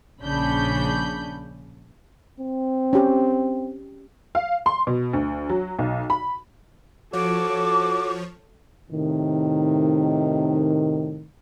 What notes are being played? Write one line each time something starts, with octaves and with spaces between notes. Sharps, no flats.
A#1 C#3 C#4 D4 B5 G6
C4
C#4 G4
F5
C6
B2
D2
F#3
B1
B5
F3 F#4 A4 C#5 D6
A2 C3 D#3